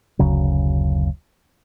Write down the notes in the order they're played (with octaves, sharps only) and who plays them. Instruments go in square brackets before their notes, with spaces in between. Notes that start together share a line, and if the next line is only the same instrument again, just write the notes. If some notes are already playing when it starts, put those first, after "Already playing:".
[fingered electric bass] F#1 D2 C#3 F#3